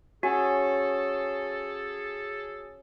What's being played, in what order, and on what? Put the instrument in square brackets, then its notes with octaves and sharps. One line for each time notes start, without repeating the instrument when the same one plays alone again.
[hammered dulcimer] C#4 [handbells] F#4 [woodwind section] G#4 A4 [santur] G#5